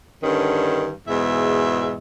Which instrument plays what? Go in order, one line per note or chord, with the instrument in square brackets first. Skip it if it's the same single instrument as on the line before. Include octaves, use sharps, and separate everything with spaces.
[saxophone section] G2 D3 D#3 C#4
E2 G#2 B2 E5